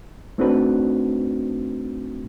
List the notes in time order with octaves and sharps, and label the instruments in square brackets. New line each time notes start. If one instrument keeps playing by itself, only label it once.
[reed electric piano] A3 C4 D4 D#4 F#4 B4